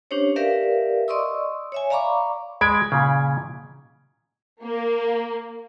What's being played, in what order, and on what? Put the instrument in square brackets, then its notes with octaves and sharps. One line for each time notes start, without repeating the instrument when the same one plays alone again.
[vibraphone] C#4 D4 G4 C5 C#5
G4 A#4 B4 D5 E5 F5
D5 D#5 C6 C#6 D#6 E6
C#5 E5 G#5
D5 F5 A#5 B5 C#6 D6
[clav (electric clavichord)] G#3 [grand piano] B5 G#6 D7
[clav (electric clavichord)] A#2 C#3
[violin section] A#3